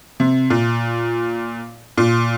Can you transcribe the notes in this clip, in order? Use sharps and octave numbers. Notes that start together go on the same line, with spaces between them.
C3
A#2
A#2